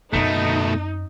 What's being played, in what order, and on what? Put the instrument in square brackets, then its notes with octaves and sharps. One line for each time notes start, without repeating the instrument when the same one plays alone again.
[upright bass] F#2 C4 [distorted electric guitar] B2 A3 [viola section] D#4